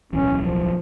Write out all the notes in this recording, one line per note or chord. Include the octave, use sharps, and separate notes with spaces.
D1 B1 E3 C#4
F3